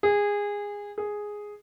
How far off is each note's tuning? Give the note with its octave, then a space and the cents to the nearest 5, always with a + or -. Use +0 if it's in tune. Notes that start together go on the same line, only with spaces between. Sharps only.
G#4 -20
G#4 +0